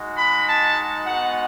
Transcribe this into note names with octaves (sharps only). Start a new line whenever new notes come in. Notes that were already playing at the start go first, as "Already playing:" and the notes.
Already playing: G#3 D#4 F#4
B5
A5
G#3 B3 D#4 F#4 F#5